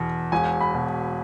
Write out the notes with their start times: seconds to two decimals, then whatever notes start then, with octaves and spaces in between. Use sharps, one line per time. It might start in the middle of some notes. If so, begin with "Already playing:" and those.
Already playing: E2 B2
0.32 E1 G#5
0.61 B5
0.74 B2